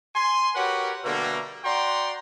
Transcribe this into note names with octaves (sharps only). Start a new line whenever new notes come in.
G#5 C6
F#4 G4 A#4 B4 C#5 F#5
B2 D3 G3 A3 A#3
F#4 D5 F#5 G5 A#5 C6